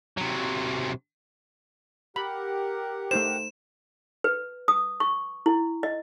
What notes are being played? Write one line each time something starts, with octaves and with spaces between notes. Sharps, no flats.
C3 F#3
G4 A#4 F#5 B5
A3 D#4 C5 E7
B4
D#6
C#6
E4
D#5